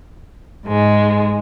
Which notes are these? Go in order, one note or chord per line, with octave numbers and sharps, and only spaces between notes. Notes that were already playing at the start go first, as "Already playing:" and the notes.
G#2 G#3